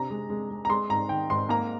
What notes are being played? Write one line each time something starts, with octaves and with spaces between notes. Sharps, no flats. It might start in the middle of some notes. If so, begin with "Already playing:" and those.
Already playing: C3 D4 A#5
G#3
G#3
G#3
A#5
G#3 C6
G#2 A#5
D#3 G5
G#2 C6
A#3 A#5